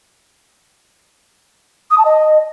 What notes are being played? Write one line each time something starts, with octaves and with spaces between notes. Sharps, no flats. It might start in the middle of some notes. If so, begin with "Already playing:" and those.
D#6
A5
D#5